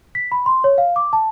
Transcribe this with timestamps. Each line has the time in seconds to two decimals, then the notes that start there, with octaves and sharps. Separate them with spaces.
0.15 B6
0.32 B5
0.46 C6
0.64 C#5
0.78 F5
0.96 D6
1.13 A5